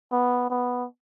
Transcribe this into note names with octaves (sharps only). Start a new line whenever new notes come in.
B3
B3